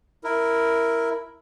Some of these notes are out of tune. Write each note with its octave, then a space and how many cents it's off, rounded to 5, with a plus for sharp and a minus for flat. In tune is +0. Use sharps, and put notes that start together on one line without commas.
E4 +0 A#4 +0